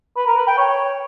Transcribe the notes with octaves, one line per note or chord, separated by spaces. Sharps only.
B4
A#4
B4
G5
C#5